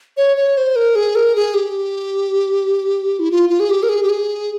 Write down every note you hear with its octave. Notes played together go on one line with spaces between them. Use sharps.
C#5
C#5
C5
A#4
G#4
A#4
G#4
G4
E4
F4
F4
G#4
G4
A#4
G#4
G4
G#4